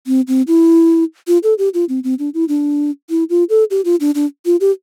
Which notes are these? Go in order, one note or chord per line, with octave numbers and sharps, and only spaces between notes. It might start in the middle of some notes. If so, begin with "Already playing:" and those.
C4
C4
E4
F4
A4
G4
F4
C4
C4
D4
E4
D4
E4
F4
A4
G4
F4
D4
D4
F4
G4